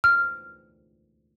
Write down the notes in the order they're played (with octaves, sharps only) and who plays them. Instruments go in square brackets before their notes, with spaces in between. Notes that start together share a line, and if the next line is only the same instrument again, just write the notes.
[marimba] F6